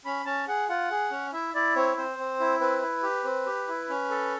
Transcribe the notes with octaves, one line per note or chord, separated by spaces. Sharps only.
C#4 B5
C#4 A5
G#4 F#5
F4 F#5
G#4
C#4
E4 E5
E4 D5
C4 C#5
C4 C5
C4
E4
C4 B4
E4
G4
C4
G4
E4
C#4
A4